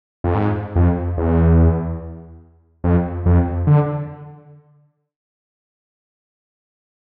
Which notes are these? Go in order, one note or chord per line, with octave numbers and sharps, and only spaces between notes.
F2
G#2
F2
E2
F2
F2
D3